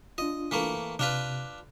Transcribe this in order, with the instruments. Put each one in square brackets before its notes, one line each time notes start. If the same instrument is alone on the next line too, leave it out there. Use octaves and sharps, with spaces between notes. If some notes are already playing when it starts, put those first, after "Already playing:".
[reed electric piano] D4 F4 [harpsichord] D#5
[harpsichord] E3 A3 A#3
[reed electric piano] C3 [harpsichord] D4 F4 B4